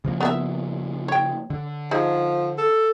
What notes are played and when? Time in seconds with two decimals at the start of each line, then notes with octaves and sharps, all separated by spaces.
0.05 C#3 F3 A#3
0.20 B3 A#4 E5
1.08 C#5 G5
1.50 D3
1.91 F3 D#4 G#4
2.58 A4